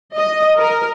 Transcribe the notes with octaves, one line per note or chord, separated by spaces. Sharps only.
D#5
A#4